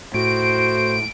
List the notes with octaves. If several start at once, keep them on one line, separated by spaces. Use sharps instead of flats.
A2 F#4 C5 D7